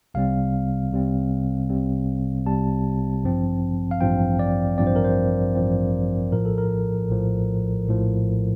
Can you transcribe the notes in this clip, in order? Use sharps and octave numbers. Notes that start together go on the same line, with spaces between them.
C2 C3 G3 C4 F5
C2 C3 G3 C4
C2 C3 G3 C4
C2 C3 G3 C4 A5
A1 G2 F3 C4
F5
A1 G2 F3 C4 G5
D5
A1 G2 F3 C4 D5
C5
A#4
C5
A1 G2 F3 C4
A#1 A2 F3 A#4
A4
A#4
A#1 A2 F3
A#1 A2 F3